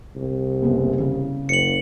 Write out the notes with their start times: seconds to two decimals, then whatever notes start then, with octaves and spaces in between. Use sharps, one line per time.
0.16 C2
0.62 F#1 B3 G#4
1.00 C#3
1.49 F#1 C#7 F#7